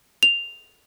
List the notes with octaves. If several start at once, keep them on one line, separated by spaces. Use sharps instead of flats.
F7